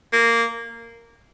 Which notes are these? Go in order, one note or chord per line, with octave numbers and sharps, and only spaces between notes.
A#3